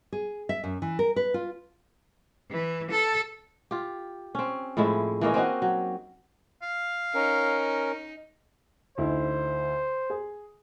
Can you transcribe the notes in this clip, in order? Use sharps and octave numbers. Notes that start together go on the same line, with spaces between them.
G#4
E5
F#2
E3
A#4
B4
F4
E3
A4
F4 G4
C4 C#4
A2 F3 G#3 E4
E3 A#3 C#4 D#5
C4 C#4 D#4 F#4
F#3
F5
C#4 D#4 A#4
D2 D#4 E4 C5
G#4